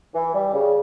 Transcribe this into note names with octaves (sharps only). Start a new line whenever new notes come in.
E3
G3
C#3